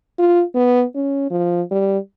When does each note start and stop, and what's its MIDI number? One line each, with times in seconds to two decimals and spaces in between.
0.19 0.43 65
0.55 0.84 59
0.95 1.29 61
1.31 1.62 53
1.71 1.98 55